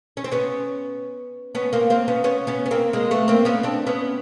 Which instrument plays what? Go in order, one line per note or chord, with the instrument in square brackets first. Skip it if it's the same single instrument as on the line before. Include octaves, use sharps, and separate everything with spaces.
[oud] C#4
C4
B3 C#4
B3 C#4
A#3 C4
A#3 C4
B3 C#4
B3 C#4
B3 C#4
B3
A#3 C4
G#3 A#3
A3 B3
A#3 C4
B3 C#4
C4 D4
B3 C#4